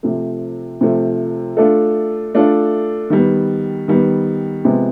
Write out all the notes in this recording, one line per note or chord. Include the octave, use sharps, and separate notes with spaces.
C3 F3 A3
C3 F3 A3
A3 D4 F4 A4
A3 D4 F4 A4
D#3 G3 B3
D#3 G3 B3
C3 F3 G#3 B3